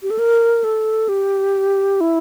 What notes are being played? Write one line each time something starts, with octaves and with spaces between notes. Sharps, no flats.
G4
A4
A#4
A4
G4
E4